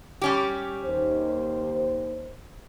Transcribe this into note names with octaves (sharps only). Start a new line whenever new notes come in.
G3 C#4 G4
D#2 C5